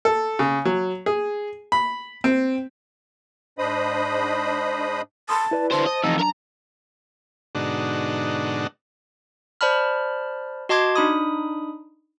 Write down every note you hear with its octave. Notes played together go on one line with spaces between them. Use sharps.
A4
C#3
F#3
G#4
B5
C4
G#2 D4 C5 D#5 B5 D#6
A5 B5 C6 D#6
E4 B4 D5
D3 C5 A5
C5 D#5
F2 E3 D#4 E6
F#3 D4 A#4 A#5
G#2 B2 D3 D4 D#4 F#4
C5 D5 A5 B5 F6
F#4 D#5 A5 C6 D6 G#6
D4 D#4 B5 D#6